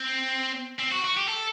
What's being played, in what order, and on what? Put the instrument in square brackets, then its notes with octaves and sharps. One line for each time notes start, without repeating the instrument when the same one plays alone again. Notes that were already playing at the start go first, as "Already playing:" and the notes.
Already playing: [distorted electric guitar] C4
C4
F#4
F#4
G4
A4